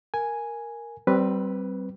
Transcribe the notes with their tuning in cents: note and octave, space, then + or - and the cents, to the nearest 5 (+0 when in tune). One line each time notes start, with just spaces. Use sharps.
A#4 +0 G#5 +0
G3 -25 C4 +0 B4 +0